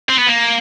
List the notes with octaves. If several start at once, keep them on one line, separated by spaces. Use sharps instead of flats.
C4
B3
A#3